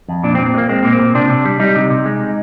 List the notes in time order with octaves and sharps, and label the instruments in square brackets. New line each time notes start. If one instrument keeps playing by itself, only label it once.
[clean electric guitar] F2
A#2 D4
C4
A#2
C4
G#3
A#3
G#3 C4
A#2 A#3
C4
A#2
C3 D4
C3
G3
G3 D#4
C3
C3
G#3